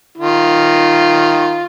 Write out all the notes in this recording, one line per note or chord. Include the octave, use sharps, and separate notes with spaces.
D#3 F4